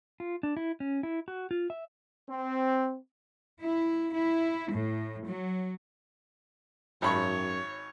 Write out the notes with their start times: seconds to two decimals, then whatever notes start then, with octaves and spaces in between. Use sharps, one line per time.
0.20 F4
0.43 D4
0.57 E4
0.80 C#4
1.03 E4
1.28 F#4
1.51 F4
1.70 E5
2.30 C4
3.61 E4
4.13 E4
4.71 A2
5.24 F#3
7.02 G#1 F#2 C#5 B5 C#6